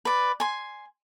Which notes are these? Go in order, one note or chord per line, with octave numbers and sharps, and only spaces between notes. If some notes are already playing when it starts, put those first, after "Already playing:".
B4 D5
G#5 C6